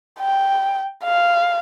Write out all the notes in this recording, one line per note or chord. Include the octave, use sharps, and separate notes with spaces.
G5
F5